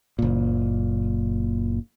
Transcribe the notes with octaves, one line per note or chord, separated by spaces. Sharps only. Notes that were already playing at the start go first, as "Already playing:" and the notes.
F#1 A#2